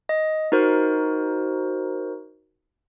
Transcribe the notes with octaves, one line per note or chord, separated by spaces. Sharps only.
D#5
D#4 F#4 A#4 C5